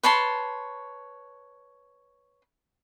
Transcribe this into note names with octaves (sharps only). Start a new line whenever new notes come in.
B4 C#5 A5 C6